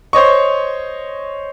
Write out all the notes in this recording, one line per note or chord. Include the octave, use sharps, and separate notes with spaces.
C5 C#5 D#5 C#6